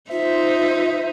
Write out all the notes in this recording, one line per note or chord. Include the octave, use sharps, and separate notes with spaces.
D#4 F4 C5 E5